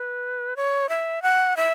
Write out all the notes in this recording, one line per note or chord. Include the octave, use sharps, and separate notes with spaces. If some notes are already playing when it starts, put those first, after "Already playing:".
Already playing: B4
C#5
E5
F#5
E5